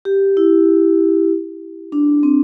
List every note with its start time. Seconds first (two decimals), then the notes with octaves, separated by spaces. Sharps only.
0.05 G4
0.37 E4
1.92 D4
2.23 C4